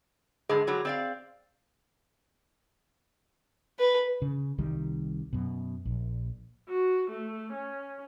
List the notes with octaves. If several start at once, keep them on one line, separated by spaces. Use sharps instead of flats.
G2 D3 G#3 G#4
D3 F#3 G3
C4 D5 F5
B4
C#3
C2 D#3 G3
F#2 B2
A#1
F#4
A3
C#4